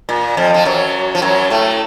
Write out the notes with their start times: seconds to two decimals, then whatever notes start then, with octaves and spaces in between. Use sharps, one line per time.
0.09 A#2
0.37 F2 F3
0.54 F3
0.65 F#2 F#3
1.15 F3
1.22 F#2 F#3
1.50 A2 A3